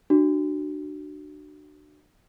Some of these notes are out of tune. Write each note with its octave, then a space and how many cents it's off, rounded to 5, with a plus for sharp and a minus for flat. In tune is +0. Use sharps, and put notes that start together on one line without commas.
D4 +30 F#4 +20